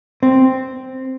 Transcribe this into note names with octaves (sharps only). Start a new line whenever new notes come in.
C4